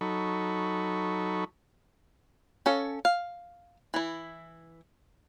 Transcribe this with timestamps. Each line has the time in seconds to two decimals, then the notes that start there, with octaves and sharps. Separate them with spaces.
0.01 F#3 D#4 A4 B5 C#6
2.66 C#4 A4 F5
3.05 F5
3.94 E3 E4